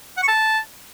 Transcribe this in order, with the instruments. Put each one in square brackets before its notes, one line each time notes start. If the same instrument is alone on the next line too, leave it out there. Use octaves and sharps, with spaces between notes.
[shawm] F#5
C#6
A5